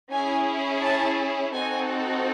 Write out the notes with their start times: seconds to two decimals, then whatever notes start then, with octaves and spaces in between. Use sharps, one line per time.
0.11 C#4 E4 G#4 G#5
0.82 A5
1.53 C4 D#4 F#4 A4 G#5